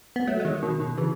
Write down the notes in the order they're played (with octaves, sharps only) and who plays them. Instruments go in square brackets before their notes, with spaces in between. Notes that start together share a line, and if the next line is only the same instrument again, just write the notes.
[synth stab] B3
F#3 A3
G#3
D#3 F#3
B2 D#3
B2 D#3
C#3 E3